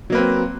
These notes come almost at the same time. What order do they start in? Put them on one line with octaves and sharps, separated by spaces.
F#3 A#3 B4 C4